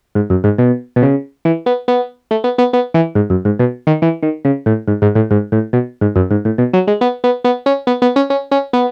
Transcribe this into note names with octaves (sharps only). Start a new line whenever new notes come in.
G#2
F#2
G#2
B2
B2
C#3
E3
B3
B3
A3
B3
B3
B3
E3
G#2
F#2
G#2
B2
D#3
E3
D#3
C#3
A2
G#2
G#2
A2
G#2
A2
B2
G#2
F#2
G#2
A2
B2
F#3
G#3
B3
B3
B3
C#4
B3
B3
C#4
C#4
C#4
B3